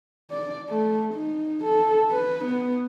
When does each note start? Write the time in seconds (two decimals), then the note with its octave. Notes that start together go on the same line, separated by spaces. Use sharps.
0.31 D5
0.69 A3
1.14 D#4
1.64 A4
2.10 B4
2.45 B3